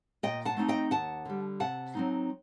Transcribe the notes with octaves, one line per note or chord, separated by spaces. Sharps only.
A#2 D#5 G5
F#5 A5
A3 C4 D#4
D#5 G5
D#2 F#5 A5
D3 G3
C3 F#5 A5
F#3 C4 D#4